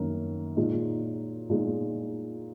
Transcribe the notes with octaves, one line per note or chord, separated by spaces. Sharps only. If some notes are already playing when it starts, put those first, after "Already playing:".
Already playing: F#2 D#3 A#3
A#2 G#3 D#4
A#2 G#3 D#4